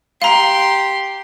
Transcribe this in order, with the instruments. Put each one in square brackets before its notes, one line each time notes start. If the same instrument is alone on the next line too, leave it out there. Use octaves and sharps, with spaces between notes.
[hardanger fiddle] G4 C6 [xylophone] F5 A#5